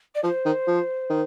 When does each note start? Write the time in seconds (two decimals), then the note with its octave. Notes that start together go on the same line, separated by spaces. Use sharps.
0.15 D5
0.23 F3 C5
0.45 D#3
0.67 F3
1.10 D#3